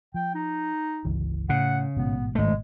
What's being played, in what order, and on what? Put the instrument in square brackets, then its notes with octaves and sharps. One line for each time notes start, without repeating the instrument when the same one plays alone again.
[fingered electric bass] F3 [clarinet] G5
[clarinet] D#4
[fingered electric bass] G1 C#2 E3
[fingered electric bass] A2 [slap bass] C#3 [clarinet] F#5
[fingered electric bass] A1 G#2 B2 [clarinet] B3
[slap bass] G#1 A3 [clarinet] G#3